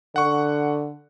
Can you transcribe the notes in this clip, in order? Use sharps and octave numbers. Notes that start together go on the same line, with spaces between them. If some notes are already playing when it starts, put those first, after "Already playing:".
D3 F#5 C#6